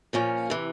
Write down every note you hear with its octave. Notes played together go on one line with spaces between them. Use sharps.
A#2 F3 A#3 C#4
C3 E3